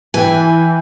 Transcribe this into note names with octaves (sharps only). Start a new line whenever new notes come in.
E3 B4 G5 G#5